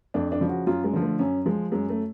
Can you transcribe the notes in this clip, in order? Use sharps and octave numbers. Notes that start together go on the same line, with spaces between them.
F2 D4
D4
C#3 F3
F#4
F#2 F4
G#3
D3 F3
A3
F#2 C#4
F3 G#3
F#2 G#3
A3